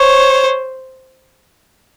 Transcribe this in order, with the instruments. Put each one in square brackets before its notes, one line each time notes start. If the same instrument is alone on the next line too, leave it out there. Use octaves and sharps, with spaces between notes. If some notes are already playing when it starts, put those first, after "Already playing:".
Already playing: [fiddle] C5 [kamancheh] C#5